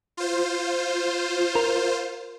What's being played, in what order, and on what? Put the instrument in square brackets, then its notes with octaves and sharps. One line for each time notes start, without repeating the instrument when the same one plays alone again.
[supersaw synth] F4 C5
[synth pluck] A#4